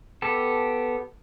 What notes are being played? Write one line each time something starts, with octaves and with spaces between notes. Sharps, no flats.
B3 G4 A4